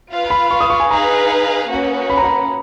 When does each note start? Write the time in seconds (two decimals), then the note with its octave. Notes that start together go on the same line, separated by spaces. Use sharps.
0.11 F4 B4 F5
0.30 B5
0.51 C#6
0.61 D#6
0.70 C#6
0.80 G#5
0.90 D#4 G#4 B4 F5 A#5
1.70 A#3 C#4 F#4 B4
2.10 B5
2.17 A#5
2.24 B5